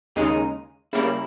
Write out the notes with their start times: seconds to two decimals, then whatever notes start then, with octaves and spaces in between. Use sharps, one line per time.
0.16 D#2 C#3 G#3 D#4
0.93 C#3 G3 A#3 E4